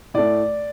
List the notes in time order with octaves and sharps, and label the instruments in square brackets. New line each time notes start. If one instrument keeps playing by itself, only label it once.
[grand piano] A2 A3 D5